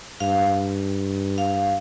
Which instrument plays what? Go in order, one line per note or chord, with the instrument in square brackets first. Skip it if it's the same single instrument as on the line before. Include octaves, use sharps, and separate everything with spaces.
[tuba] G2 [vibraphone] F5
[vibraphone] F5